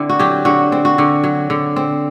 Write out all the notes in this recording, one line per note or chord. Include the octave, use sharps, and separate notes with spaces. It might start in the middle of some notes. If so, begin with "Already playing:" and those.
Already playing: D3 C4 D4 E4
F#4
F#3 G4
D3 F#4
C4
F#4
D3
F#3
D3
C4